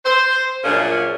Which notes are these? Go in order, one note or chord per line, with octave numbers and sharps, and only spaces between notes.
C5
F#2 A#2 F3 C#4 D4 G#4